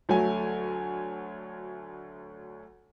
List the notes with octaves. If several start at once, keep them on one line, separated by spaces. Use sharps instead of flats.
D2 F#3 A3 G#5